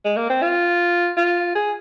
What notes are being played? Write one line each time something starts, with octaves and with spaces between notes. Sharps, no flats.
G#3
A#3
C4
F4
F4
G#4